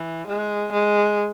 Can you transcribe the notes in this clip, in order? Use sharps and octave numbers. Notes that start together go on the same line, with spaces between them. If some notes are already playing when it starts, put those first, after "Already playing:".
Already playing: E3
G#3
G#3